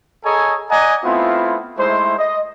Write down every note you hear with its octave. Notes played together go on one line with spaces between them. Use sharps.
G#4 A4 C#5 D#5 G#5 A#5
D5 D#5 F#5 G#5 A#5
A3 B3 C4 E4 F4
G#3 A3 D#4 E4 C5
D#5